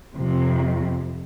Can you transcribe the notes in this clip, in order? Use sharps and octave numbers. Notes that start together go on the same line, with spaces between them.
F2 C3